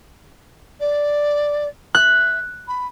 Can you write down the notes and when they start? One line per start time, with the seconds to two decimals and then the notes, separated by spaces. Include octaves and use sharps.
0.79 D5
1.95 E5 F#6
2.68 B5